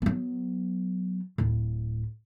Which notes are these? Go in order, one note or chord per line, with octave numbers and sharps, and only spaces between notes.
F#3 B3
D1 A2